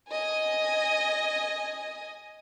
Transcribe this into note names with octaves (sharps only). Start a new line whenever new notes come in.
D#5 G#5